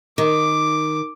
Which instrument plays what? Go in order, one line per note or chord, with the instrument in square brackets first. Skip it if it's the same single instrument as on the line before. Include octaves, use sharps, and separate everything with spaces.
[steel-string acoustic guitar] D#3 [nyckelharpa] D6